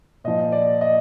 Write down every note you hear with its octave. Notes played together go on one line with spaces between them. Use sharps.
A#2 F3 D#5
D5
D#5